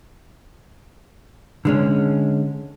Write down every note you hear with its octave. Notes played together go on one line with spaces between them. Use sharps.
D3 G#3 C#4